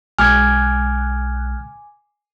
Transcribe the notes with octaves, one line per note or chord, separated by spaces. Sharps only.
B1 G#3 G#5 D6 F6 F#6 G#6